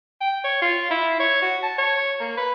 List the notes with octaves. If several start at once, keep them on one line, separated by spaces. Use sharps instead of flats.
G5
C#5
F4
E4
C#5
F#4
A5
C#5
A#3
B4